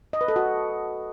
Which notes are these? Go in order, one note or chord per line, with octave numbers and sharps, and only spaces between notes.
D#5
B4
A4
F#4